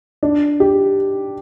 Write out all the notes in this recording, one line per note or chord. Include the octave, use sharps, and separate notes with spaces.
D4
G4